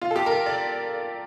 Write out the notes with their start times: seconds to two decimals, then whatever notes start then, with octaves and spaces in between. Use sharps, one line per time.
0.02 F4
0.11 A4
0.16 G4
0.26 A#4
0.31 A4
0.46 D5